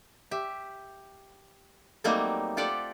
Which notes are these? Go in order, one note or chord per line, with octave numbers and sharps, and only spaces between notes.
G4 E5
F#3 G3 A3 A#3 C4 D#4
F4 G4 A4 D5 F#5